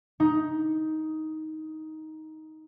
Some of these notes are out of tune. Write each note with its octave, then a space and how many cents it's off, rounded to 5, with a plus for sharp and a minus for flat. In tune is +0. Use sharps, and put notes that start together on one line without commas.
D#4 +10